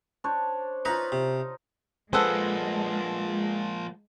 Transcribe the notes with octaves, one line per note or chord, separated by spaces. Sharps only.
D4 C5 C#5
D#4 F4 B4 A#5
C3
F3 G#3 A#3 G#4 A4 B4 C5 F#5